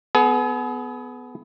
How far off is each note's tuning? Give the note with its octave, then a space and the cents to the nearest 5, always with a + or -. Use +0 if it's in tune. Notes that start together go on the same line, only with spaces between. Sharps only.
B3 +10 G#4 +40